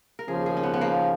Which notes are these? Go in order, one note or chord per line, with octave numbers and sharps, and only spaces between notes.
A#4
D#2 C#3 F3 G#4
G#4
C#4
B3
B3
A#3